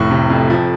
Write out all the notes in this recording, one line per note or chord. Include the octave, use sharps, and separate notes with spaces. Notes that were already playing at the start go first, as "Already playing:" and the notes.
Already playing: F1 A2 C#6
C3
F2
F3